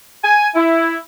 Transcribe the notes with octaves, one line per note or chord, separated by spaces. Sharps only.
G#5
E4